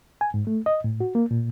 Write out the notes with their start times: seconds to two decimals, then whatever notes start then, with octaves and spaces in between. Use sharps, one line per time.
0.21 G#5
0.34 G#2
0.47 A3
0.66 D#5
0.84 A2
1.00 F#4
1.15 A#3
1.31 A#2